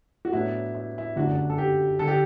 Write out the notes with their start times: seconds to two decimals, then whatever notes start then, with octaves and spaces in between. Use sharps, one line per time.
0.25 F#4
0.32 A2 F#3 B3 D4 E4
0.75 E4
0.98 E4
1.16 G1 F#2 D3 A3 D4 F#4
1.50 A4
1.58 G4
1.99 D3 A4
2.08 G4